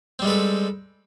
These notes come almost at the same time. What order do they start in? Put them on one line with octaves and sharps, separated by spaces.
C4 G3 G#3 B4 A4